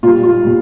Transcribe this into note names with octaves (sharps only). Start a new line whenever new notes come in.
A#2 G3 F4
F4
A#2 G3